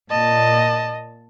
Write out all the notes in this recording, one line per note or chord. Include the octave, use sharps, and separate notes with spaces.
A#2 D#5 A5